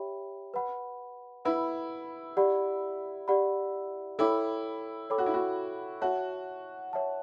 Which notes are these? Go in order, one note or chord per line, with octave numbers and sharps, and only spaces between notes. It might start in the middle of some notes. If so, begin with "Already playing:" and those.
Already playing: G4 C#5 E5 G5 B5
B4 F#5 B5
E4 B4 F#5 B5
G4 D5 F#5 B5
G4 D5 F#5 B5
E4 A4 C#5 G5 B5 D6
A4 C#5 G5 B5 D6
F#4
E4
F#4
F#4 C#5 E5 A5
C#5 E5 A5